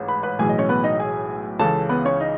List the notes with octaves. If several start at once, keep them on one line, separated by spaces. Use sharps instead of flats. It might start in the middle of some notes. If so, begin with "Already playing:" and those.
Already playing: A1 G#2
B4 B5
B4 B5
B1 A2 E3 G#3 G#4 G#5
D#5
C#4 C#5
B3 B4
D#4 D#5
G#4 G#5
C#2 C#3 E3 A4 A5
B3 B4
C#4 C#5
D#4 D#5